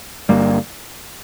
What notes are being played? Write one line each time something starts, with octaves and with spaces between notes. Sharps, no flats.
G1 G2 G3 A#3